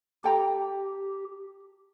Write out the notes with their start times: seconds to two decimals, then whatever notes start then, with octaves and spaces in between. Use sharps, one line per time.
0.24 G4 A4 G5 A#5